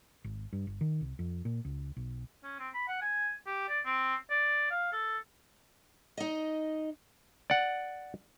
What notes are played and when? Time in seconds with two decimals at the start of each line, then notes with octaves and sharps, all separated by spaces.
0.24 G#1
0.53 G2
0.67 G1
0.81 D#3
1.01 C2
1.19 F2
1.45 A#2
1.65 C#2
1.97 B1
2.44 C#4
2.59 C4
2.74 B5
2.88 F#5
3.02 G#5
3.47 G4
3.69 D5
3.86 C4
4.30 D5
4.71 F5
4.92 A4
6.17 D#4 D#5
7.50 D5 F#5